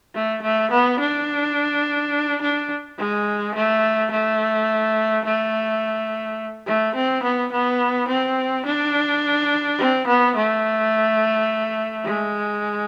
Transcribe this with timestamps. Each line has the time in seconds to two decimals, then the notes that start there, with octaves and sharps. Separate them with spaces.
0.15 A3
0.42 A3
0.71 B3
1.00 D4
2.41 D4
2.98 G#3
3.55 A3
4.11 A3
5.25 A3
6.66 A3
6.95 C4
7.23 B3
7.52 B3
8.08 C4
8.66 D4
9.78 C4
10.07 B3
10.36 A3
12.05 G#3